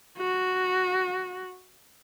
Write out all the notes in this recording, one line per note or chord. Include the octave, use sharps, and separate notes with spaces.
F#4